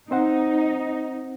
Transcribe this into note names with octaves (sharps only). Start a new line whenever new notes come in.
C4 D#4 C5 F#5